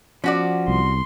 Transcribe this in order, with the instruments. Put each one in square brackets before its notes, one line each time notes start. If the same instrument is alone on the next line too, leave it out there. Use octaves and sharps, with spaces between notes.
[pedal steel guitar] F3 [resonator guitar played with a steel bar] C#4 F#4 D5
[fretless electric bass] C2 [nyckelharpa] C6